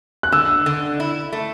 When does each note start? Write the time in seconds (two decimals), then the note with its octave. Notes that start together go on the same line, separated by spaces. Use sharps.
0.23 F#6
0.32 D3 E6
0.66 D3
1.00 E4
1.33 A3